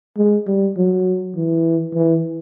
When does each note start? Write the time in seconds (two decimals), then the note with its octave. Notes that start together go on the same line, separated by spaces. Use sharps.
0.17 G#3
0.47 G3
0.77 F#3
1.36 E3
1.94 E3